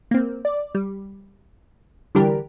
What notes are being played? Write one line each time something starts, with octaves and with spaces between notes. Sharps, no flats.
A#3 C4
D5
G3
D3 E3 G3 D4 G4 A#4